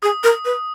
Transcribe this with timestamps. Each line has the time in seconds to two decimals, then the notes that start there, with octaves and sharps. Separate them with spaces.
0.03 G#4 D#6
0.24 A#4
0.45 B4